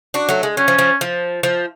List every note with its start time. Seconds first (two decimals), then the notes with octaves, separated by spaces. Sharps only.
0.14 D4 F#4
0.29 F#3 A3
0.43 G#3
0.57 F#3 C#4
0.68 F3
0.78 F3
1.01 F3
1.43 F3